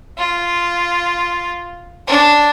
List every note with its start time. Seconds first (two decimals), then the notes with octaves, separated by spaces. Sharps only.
0.18 F4
2.08 D4